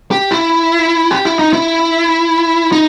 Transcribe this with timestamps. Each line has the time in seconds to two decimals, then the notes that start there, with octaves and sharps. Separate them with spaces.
0.11 G4
0.31 E4
1.11 G4
1.25 E4
1.39 D#4
1.53 E4
2.72 D#4